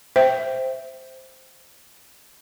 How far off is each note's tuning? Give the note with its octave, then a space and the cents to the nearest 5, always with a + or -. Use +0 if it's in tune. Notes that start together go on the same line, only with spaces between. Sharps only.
C5 +0 E5 +0 G5 +0